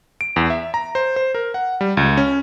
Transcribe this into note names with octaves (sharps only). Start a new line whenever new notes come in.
D7
E2
E5
A#5
C5
C5
A#4
F#5
G3
C#2
C#4